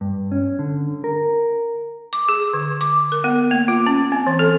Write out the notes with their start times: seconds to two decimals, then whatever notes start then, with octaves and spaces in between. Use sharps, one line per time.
0.01 G2
0.32 C#4
0.59 D3
1.04 A#4
2.13 D6
2.29 G#4
2.54 D3
2.81 D6
3.12 A#4
3.24 B3
3.51 A#3
3.68 F4
3.87 C#4
4.12 C4
4.27 E3
4.39 A4